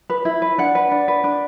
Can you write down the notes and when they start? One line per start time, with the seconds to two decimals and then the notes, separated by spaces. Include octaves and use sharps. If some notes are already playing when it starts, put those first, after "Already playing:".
0.10 B4
0.25 E4
0.42 B4
0.58 D4 F#5
0.75 B4
0.92 D4
1.08 B4
1.24 D4